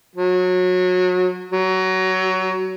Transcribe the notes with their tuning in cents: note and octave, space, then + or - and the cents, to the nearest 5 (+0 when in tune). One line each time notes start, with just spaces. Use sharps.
F#3 -25
F#3 +20